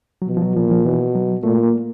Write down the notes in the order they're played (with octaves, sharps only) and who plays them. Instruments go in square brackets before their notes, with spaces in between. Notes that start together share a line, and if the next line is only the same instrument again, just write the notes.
[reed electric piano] F#3
[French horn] B2 [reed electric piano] F3
[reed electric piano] F3
F#3
[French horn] A#2 [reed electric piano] F3
[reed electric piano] E3
F3
[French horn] B2 [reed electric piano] E3
[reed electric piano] F#3
[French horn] A#2 [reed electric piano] A3
[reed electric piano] A#3